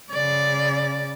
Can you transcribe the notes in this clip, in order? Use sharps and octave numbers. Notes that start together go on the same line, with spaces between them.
C#3 D5